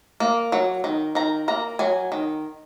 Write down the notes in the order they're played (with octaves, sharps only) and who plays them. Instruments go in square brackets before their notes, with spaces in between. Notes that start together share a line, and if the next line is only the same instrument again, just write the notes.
[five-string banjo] A#3
F#3
D#3
D#3 A#5
A#3 A#5
F#3 G#5
D#3